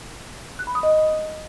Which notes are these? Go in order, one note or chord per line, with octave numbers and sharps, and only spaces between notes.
F#6
B5
D#6
D#5